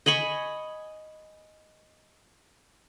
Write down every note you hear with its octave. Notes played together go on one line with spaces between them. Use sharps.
D#5 G#5 B5 C#6